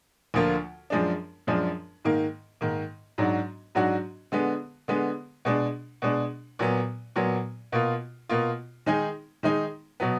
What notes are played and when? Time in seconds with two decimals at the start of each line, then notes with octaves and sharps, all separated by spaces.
0.34 D2 D3 F3 A#3 F4
0.90 F#2 F3 G#3 D4
1.47 F#2 F3 G#3 D4
2.05 G#2 D#3 A#3
2.61 G#2 D#3 A#3
3.18 G#2 F#3 D4 F#4
3.75 G#2 F#3 D4 F#4
4.32 D3 G#3 B3
4.88 D3 G#3 B3
5.45 B2 G#3 D4
6.02 B2 G#3 D4
6.59 A#2 F#3 B3
7.16 A#2 F#3 B3
7.72 B2 A#3 F4
8.29 B2 A#3 F4
8.86 D#3 G#3 D#4 G#4
9.43 D#3 G#3 D#4 G#4
10.00 B2 F#3 B3